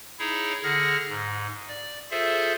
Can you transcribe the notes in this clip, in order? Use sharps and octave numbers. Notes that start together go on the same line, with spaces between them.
D#4 E4 G#4 C#5
D3 G#4 F#5 F6 A#6
G#2
D5
F4 G#4 A4 C5 E5